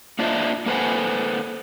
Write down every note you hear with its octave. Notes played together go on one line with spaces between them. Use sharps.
A#3 D4 F4 C5 D#5 E5
A#3 A4 B4 C5 F#5 G#5